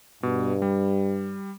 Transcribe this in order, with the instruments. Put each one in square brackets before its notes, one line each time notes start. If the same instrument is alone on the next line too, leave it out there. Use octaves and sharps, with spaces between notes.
[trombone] G2 [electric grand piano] B2
[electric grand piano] G3